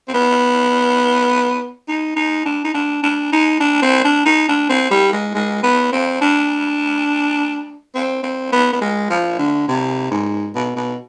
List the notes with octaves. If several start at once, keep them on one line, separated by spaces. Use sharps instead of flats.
C4
B3
D#4
D#4
D4
D#4
D4
D4
D#4
D4
C4
D4
D#4
D4
C4
G3
G#3
G#3
B3
C4
D4
C4
C4
B3
B3
G#3
F3
D3
C3
G#2
B2
B2